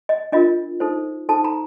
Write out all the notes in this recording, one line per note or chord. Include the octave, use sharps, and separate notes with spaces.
D#5
D4 F4 A#4 D#5
D#4 A4 C5
D#4 A4 C5 A5
A#5